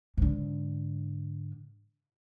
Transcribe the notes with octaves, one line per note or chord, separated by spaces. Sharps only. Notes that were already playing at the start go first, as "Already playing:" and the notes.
G#2 D3